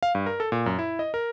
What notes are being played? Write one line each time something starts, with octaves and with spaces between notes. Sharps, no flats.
F5
G2
A#4
A4
A#2
F#2
E4
D#5
A#4